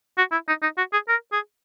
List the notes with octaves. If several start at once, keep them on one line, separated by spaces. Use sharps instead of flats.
F#4
E4
D#4
D#4
F#4
G#4
A#4
G#4